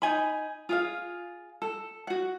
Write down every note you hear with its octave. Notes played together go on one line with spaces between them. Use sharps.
D#4 G#5 B5
F4 G#4 F5
A4
F#4 F#5